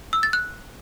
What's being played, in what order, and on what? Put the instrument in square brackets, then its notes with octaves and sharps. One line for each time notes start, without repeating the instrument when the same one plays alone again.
[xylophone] E6
A6
F#6